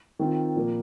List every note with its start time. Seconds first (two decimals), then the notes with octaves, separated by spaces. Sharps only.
0.19 D#3 C4 F4
0.56 A#2 F3 A#3